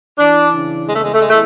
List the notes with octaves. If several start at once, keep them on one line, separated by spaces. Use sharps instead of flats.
E3 D4
C#3
E2 G#3
A3
G#3
A3
E2 G#3
A3